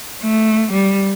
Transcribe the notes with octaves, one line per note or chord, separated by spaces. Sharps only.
A3
G3